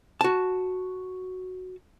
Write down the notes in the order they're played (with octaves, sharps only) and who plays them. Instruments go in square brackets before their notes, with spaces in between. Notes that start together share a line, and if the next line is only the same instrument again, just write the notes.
[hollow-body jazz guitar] F#4 A5